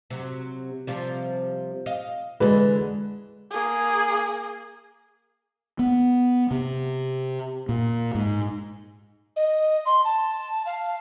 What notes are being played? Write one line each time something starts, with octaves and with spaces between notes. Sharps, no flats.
C3 F#3
C3 F3 G3
D#5 F5
D3 E3 G#3 B4
A#3 G#4
B3
C3
A#2
G#2
D#5
C6
A5
F5